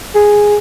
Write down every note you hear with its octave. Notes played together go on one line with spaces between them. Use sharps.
G#4